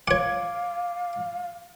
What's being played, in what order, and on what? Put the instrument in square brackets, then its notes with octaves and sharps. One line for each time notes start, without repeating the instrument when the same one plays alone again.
[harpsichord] C#5 F#5 [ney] F5 [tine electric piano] D6